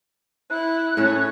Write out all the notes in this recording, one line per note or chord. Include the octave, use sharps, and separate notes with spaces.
E4 F#6
A2 C#4 C#5 E5